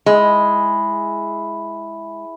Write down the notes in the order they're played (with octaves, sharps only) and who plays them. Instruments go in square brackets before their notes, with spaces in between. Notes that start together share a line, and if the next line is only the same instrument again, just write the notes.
[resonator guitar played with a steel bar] G#3 [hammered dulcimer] E4 G#4